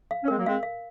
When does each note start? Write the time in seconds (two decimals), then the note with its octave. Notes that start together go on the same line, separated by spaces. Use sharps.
0.11 F5
0.23 C#4
0.28 G#3 C4 A#4
0.37 F#3 A#3
0.45 G#3 C4 F5
0.63 F5